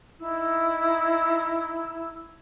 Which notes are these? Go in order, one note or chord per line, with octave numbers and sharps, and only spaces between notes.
D#4 E4 E6